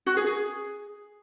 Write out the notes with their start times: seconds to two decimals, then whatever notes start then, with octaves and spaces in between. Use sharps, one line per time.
0.06 F#4
0.17 G#4
0.27 G#4